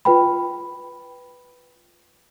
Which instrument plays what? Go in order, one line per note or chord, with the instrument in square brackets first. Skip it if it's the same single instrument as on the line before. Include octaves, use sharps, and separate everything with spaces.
[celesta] F4 B4 G5 B5